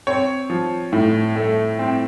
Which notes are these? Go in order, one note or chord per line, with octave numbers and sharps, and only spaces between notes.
C4 C#5
F3
A2
A3
C4